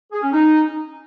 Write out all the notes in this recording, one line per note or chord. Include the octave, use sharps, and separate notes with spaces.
G#4
C#4
D#4